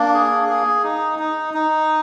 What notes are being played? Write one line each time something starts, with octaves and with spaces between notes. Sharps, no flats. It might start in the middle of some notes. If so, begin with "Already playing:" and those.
Already playing: A#3 D4
G#4
G#4
D#4
D#4
D#4